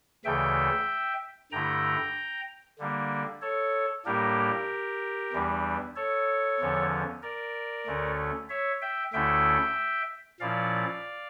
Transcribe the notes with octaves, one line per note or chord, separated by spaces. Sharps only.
D2 C#3 E3 A3 E5 G5
G2 D3 A3 E4 G5 A#5
D3 G3 A#3 D4
A4 C#5
A2 G3 A#3 D4 G4 A#4
E2 E3 G3 D4
A4 C#5
E2 D3 F3 C#4
A#4 D5
D2 D3 A3 C#4
C#5 E5
E5 G5
D2 D3 A3 C#4 E4 E5 G5
A#2 F3 C#4 E4 D5 F5